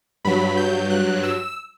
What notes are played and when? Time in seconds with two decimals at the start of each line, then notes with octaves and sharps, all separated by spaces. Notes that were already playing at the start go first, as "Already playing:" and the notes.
0.25 G2 F#3 B5
0.57 G6
0.90 F#6
1.23 E6